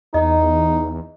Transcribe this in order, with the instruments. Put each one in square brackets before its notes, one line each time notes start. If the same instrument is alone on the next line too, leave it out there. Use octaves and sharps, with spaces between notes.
[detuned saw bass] E2 [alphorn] D#4 [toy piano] D#5